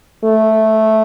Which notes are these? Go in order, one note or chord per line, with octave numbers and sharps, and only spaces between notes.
A3